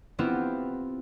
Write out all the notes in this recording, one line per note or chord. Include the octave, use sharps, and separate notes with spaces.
B3 C4 E4 F4 G4